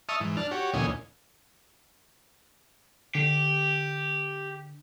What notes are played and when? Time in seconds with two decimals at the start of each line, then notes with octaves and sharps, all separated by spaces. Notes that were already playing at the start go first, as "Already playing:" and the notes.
0.09 D#5 E5 A5 C#6 D#6 F6
0.20 G#2 E3
0.37 D4 A5 F6
0.51 F#4 G4 C#5
0.74 D2 A#2 E3 C#4 D#5 G#5
3.15 D3 G4